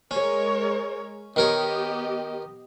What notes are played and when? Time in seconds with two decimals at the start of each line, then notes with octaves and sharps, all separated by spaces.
0.11 G#3 C#4 A#4 C#5
1.36 D#3 B3 G4 A#4 C#5 D#5